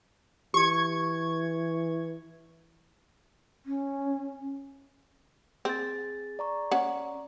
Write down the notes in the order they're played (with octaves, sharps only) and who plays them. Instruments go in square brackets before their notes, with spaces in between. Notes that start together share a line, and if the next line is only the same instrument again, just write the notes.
[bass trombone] E3 [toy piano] G4 [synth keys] C#6 G#6
[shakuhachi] C#4
[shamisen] C4 [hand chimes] G#4 A6
[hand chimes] D5 A#5 C#6
[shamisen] C#4 F#5